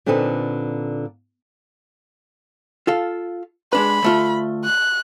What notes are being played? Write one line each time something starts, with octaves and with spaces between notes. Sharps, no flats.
A#2 D3 C4 D#4 A4 B4
F4 A4 F5
G#3 D4 B4 B5
D2 A3 F4
F#6